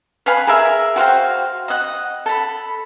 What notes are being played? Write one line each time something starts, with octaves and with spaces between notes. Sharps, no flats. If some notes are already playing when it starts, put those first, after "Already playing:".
B4 F5 G#5 B5
G#4 A#4 E5
F#4 C5 F5 G5
D#5 F#5
A4 B5